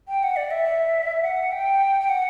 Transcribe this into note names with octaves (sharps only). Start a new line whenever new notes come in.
G5
F#5
D5
E5
F#5
G5
G5
F#5